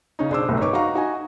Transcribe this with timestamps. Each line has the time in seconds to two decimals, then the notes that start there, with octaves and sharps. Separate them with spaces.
0.19 C#3 C#4 D#4
0.30 B1 D4 G#4 C5 D6 E6
0.48 G1 C2 F#2 A2 G4
0.60 D#4 B4 C#5 C#6 D6
0.73 D#4 F#4 D#5 F5 A#5 C#6
0.95 D#4 F#4 D#5 G#5 A#5